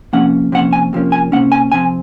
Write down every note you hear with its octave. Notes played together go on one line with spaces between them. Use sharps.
C3 F3 A#3 C#4 F#5
C3 F3 A#3 C#4 F#5
G#5
C3 F3 A#3 C#4
G#5
C3 F3 A#3 C#4 F#5
G#5
C3 F3 C4 G#5